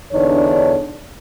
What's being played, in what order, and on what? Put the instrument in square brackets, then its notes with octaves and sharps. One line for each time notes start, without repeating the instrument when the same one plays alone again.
[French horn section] E2 D3 D4 D#4 C#5